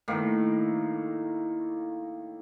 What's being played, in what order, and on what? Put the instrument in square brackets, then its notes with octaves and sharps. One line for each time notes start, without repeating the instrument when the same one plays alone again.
[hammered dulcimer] A2 D#3 A#3